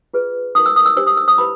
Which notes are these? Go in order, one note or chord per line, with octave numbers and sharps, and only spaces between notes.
F4 G#4 B4
D#4 F#4 A#4 D#6
E6
D#6
E6
D4 G4 C5 E6
D#6
E6
D#6
E4 G4 B4 B5